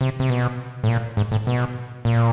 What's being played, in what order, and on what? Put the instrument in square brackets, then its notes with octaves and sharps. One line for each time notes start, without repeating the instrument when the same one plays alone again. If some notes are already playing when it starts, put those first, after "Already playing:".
[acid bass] C3
C3
B2
A2
A#2
G#2
A2
B2
A#2